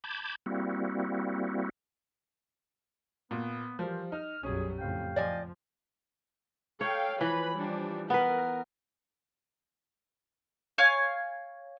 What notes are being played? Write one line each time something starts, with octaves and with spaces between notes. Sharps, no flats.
A5 B5 D6 G6 G#6
G3 A#3 C4 E4 F#4
A#2 B3
E3 F3 G3 A#4 C5
D#4 F6
B1 F#2 F#3 G3 C#4 G#4
F2 A2 C#3 F5 G5
F3 D5 D#5 G#5
A4 C#5 F5 G5
E3 F3 B4 B5
F3 G3 D4
B3 A#4 B4
C#5 F5 G#5